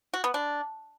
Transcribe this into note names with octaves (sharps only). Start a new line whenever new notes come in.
F#4
B3
D4